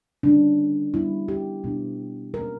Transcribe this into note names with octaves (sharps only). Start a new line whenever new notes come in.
D3 G3 C#4 D4
D3 G3 B3 E4
G4
B2 G3 B3 D4
B2 F#3 A#3 C#4 A#4